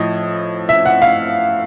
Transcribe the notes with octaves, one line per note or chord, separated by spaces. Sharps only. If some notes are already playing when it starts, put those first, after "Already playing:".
Already playing: A2 F3 D#5
E5
F#5
F5